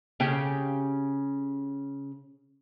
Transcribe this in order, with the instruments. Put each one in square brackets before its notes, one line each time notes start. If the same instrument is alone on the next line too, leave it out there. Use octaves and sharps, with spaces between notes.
[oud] C#3 C#4 G4